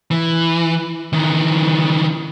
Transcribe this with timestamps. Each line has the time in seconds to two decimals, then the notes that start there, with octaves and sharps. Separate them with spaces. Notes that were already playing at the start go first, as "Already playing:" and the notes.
0.11 E3
1.13 D#3 E3